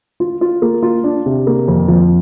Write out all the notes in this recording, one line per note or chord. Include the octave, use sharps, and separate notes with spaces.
F4
F4
A#3
F4
D4
C3
A#3
F2
F3